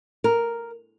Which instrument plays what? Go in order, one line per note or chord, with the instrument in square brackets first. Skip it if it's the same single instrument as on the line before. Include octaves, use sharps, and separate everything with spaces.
[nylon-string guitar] A#4